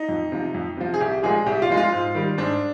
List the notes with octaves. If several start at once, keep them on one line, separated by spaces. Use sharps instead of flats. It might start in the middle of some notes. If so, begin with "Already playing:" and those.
Already playing: D#4
F2
C3 F3
F2
C3 F3
G#4
C2 G4
A#2 F3 G#3 G#4
C2 G4
F4
A#2 F3 G#3
F4
G#2
D#3 G3
G#2 D4